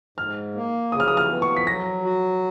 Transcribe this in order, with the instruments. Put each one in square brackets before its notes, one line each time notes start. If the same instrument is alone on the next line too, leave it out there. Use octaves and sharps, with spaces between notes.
[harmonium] G#2 [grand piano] F6
[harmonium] A#3
[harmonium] C#3 [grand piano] D#6
[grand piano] F6
D#6
F6
[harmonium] B3
[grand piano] C#6
B6
[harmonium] F#3 [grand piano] A#6
[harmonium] F#4